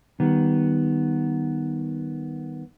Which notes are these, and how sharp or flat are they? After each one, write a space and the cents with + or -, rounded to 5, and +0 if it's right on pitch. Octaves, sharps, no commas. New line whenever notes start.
D#3 +0 G3 -15 B3 +0